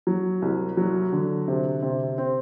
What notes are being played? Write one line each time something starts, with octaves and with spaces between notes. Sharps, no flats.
F#3
C2
F#3
D3
C3
C3
C4